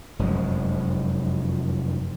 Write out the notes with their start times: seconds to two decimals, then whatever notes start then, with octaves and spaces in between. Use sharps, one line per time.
0.19 F1 F#2 F3 G#3